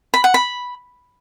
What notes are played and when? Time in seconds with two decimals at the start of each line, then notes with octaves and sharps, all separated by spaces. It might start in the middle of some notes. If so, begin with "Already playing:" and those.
0.14 B5
0.24 F#5
0.34 B5